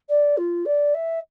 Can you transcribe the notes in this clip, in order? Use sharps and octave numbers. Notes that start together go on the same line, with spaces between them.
D5
F4
D5
E5